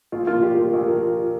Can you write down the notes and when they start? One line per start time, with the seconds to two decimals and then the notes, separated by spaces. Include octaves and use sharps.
0.12 A#1 F4
0.27 A#2 F3 A#3 F4
0.43 A#1 G4
0.58 A#2 F3 A#3
0.73 A#1
0.88 F3 A#3